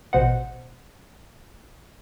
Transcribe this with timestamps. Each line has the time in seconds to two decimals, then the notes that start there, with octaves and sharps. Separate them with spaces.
0.13 A1 B2 C5 D#5 F#5